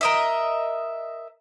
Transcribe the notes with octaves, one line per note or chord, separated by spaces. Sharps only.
A#4 D#5 E5